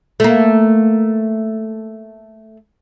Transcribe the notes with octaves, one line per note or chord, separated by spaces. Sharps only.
A3 A#3